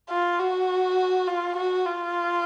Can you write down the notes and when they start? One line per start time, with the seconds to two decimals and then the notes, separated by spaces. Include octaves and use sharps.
0.10 F4
0.39 F#4
1.27 F4
1.56 F#4
1.86 F4